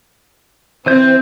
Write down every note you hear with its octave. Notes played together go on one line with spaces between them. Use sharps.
E3 C4 C5 G6